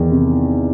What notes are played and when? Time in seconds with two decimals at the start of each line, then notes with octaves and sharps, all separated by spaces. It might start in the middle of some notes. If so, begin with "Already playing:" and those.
Already playing: E2 D#3
0.12 C3